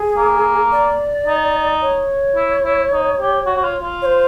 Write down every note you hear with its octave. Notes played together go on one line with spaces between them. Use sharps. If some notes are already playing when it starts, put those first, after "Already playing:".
Already playing: G#4
A#3
D5
D#4
C#5
E4
E4
D#4
G4
F#4
F#4
F4
F4
C#5
C5